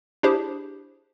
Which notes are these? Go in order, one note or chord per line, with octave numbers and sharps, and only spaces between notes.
D4 E4 G4 G#4 C5